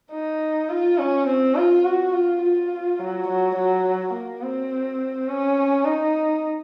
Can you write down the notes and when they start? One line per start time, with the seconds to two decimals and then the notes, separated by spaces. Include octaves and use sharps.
0.12 D#4
0.69 F4
0.98 C#4
1.27 C4
1.56 F4
1.84 F#4
2.13 F4
2.41 F4
2.99 F#3
3.28 F#3
3.55 F#3
4.13 A#3
4.42 C4
5.28 C#4
5.84 D#4